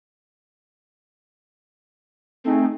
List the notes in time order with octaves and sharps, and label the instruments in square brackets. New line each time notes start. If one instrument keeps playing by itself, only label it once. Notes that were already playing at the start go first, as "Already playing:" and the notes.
[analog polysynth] A3 D#4 G#4 [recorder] C4